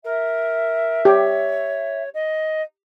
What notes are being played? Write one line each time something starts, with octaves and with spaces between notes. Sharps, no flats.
A#4 E5
G4 C#5
D#5